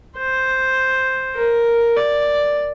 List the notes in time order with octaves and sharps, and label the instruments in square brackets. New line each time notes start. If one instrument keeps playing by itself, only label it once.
[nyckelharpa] C5
A#4
D5